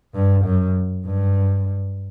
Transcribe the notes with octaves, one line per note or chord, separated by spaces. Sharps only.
G2
F#2
G2